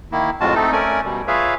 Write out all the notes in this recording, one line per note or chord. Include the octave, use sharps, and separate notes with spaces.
D#3 A#3 E4
F2 A2 G#3 F4 F#4 A5
A3 C4 D#4 A4
A3 C#4 A#4 D5 G#5
B2 G3
F4 G#4 B4 C#5 E5 F5